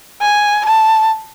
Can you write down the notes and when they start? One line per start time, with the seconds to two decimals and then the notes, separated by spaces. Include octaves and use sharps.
0.22 G#5
0.65 A5